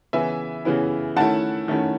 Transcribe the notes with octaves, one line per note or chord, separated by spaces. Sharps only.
C#3 E3 B3 E4 E5 G#5
C#3 E3 B3 E4
D#3 A3 C#4 E4 F#5 A5
D#3 A3 C#4 E4